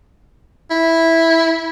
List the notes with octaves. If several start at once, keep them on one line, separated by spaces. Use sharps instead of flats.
E4